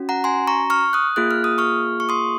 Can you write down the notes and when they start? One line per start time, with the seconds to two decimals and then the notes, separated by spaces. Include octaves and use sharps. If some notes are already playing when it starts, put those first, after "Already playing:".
Already playing: C#4 F#4
0.09 F#5 A#5
0.24 G#5 C6
0.47 A#5 C#6
0.70 C#6 F6
0.93 D#6 F#6
1.16 A#3 F4 G#4 F#6
1.31 F6
1.44 D#6
1.58 C#6 F6
2.00 C#6
2.09 C6 D#6